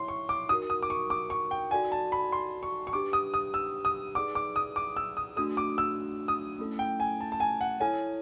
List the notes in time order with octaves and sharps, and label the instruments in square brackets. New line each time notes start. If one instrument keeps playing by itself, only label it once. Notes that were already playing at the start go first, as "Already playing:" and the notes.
Already playing: [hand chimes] E4 C#5 E5 [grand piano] C6
[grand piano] C#6
D6
[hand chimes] D#4 F#4 A#4 [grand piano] D#6
[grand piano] D#6
D6
C#6
D6
C#6
G5
[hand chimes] D#4 F#4 A4 D5 F#5 [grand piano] G#5
[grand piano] A5
B5
C6
C#6
C#6
[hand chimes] D4 G4 B4 [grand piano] D6
[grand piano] D#6
D#6
E6
D#6
[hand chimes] D#4 G#4 B4 D5 F#5 [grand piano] D6
[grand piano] D6
D#6
D6
E6
D#6
[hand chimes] A3 D4 F#4 A4 [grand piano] D#6
[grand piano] D6
E6
D#6
[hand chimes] A3 C#4 E4 A4
[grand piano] G5
G#5
A5
A5
G#5
F#5
[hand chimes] E4 A4 C#5 [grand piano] G#5